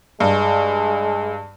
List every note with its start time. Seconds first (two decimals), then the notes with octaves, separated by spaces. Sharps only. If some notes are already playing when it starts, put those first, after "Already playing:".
0.20 G2 G#3